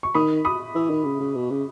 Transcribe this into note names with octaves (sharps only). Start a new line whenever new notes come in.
C#6
D#3 B5 D#6
B5 D#6
E3
D#3
C#3
C#3
B2
C#3